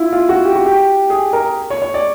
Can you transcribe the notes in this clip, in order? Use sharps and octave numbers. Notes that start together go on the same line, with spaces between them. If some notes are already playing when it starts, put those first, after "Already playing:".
Already playing: E4 F4
F4
F#4
G4
F#4
G4
G#4
A#4
C#5
C#5
D5